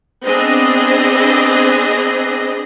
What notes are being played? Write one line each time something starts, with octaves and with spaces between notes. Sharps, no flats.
B3 C4 D4 G#4 D#5